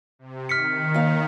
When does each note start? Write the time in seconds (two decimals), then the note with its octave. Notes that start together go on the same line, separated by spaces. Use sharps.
0.19 C3
0.49 D#3 F6 B6 C#7
0.94 D#2 F5